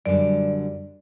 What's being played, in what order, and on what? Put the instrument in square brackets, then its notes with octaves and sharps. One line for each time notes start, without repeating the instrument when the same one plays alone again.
[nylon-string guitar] F#2 D3 G3 D4 [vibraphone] D5